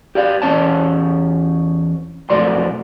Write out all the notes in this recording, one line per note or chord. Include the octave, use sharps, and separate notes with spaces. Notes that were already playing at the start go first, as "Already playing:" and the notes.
G4 D5 F5
E2 F#3 C#4 C#5 A5
B1 F2 A3 F#4 D5 C6